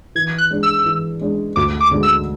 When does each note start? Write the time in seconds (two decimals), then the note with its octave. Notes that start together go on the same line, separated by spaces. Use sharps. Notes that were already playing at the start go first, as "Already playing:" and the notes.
0.15 E3 G#6
0.38 F#6
0.51 G#3 D4
0.63 E6
0.86 E3
1.21 G#3 D4
1.56 D2 D6
1.81 D6
1.91 D3 G#3 D4 G#4
2.03 E6